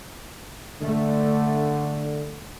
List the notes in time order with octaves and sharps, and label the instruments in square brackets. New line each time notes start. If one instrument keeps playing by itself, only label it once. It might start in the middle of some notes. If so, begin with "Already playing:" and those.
[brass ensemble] D3 [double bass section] A3